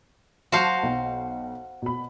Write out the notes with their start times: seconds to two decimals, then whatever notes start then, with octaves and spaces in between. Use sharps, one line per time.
0.52 F#3 F#4 C5 F5 A5 C7
0.83 B1 G5
1.82 B2 B5